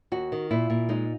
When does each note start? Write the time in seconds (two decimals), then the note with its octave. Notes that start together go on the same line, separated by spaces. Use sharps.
0.12 D#2 F#4
0.32 D#3
0.51 A#2 E4
0.70 A#2
0.89 G#3 D#4